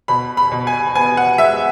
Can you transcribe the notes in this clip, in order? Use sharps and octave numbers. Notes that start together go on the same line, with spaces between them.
B2 B5
B5
B2
G#5
B3 G#5
F#5
G#3 E5